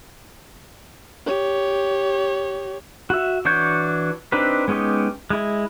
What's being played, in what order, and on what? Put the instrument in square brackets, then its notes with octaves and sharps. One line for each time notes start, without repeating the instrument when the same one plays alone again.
[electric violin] G4 C#5
[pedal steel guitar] F#4 E5
E3 D4 F#4 C#5 G6
C4 D4 D#4 G4 B4
G#3 B3 C#4 D#4 G4
G#3 E4